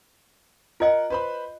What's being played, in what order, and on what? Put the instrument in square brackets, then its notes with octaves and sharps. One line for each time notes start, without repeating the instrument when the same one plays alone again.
[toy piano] F4 D#5 [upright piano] A#4 F#5
[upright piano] B4 C5 B5